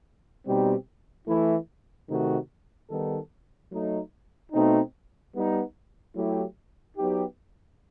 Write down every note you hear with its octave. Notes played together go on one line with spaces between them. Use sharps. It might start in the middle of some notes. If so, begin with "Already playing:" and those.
B2 G3 C4 D#4 G4
E3 A3 E4
C3 D#3 A3 D#4 F#4
D#3 G3 B3 D#4 A4
F#3 A3 D#4
B2 A3 C4 D#4
G3 B3 D#4
F#3 A3 E4 G4
F#3 B3 D#4 G4